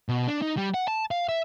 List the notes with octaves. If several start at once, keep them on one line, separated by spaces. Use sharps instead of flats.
B2
D4
D#4
G3
F#5
A5
F5
E5